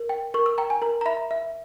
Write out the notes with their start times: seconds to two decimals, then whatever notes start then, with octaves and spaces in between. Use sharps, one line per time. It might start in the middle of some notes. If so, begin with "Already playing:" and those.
Already playing: A#4
0.09 G5
0.34 A#4 C#6
0.46 E6
0.58 G5 A#5
0.70 G#5
0.82 A#4 A#5
1.01 A#5
1.06 E5 B5
1.31 E5